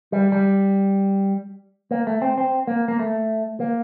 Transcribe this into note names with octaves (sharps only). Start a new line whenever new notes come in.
G3
G3
A#3
A3
C4
C4
A#3
A#3
A3
A#3